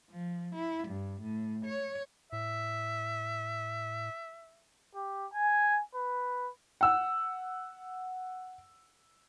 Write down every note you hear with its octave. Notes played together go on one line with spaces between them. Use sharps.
F3
E4
G2
A2
C#5
A2 E5
G4
G#5
B4
F#5 E6